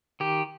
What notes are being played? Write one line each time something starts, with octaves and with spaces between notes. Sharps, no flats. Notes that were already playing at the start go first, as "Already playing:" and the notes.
D#3 G4